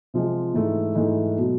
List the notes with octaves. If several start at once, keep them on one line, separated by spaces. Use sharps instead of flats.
C3 F3 G#3
G#2 E3 A3
G#2 E3 A3
B2 F#3